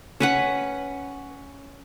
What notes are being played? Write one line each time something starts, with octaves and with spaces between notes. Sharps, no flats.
C#4 B4 F#5